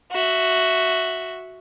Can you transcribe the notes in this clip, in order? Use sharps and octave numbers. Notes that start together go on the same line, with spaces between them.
F#4 E5